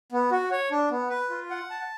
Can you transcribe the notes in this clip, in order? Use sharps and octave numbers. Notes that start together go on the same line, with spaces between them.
B3
F#4
C#5
D4
B3
B4
F4
F#5
A5